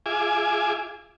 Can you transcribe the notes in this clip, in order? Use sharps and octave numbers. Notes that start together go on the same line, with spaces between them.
F4 G#4 E5 G#5 D6